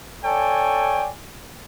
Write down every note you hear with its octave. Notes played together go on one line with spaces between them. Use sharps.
A4 C#5 D5 G5 G#5